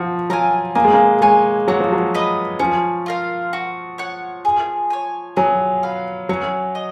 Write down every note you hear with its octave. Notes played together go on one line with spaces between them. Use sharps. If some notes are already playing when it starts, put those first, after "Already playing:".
Already playing: F3 F#4
F#3 A#4 F5 G#5
A#3 G#4
G#3
A#3
G#3 C#5 G#5
F#3 F#4
F3
F#3
B4 D#5
F3 C#4
F4 A#4 F5
F#4
C#5 F#5
G#4
C#5 G#5
F#3 G#4
B4 F5
F#3 C#4
D#5